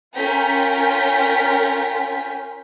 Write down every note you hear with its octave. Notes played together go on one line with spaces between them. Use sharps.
C#4 F4 A#4 G5 B6